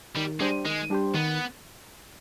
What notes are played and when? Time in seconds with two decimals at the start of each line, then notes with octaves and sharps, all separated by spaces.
0.16 D#3 G3
0.40 G3 G#3 D4 G4 C5
0.65 D#3 G#3
0.90 G3 D4 G4 C5
1.14 D#3 B3